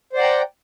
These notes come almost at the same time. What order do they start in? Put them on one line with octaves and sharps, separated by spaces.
C5 D5 F#5 A#5 G5